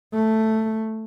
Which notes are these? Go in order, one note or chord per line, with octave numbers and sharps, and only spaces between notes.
A3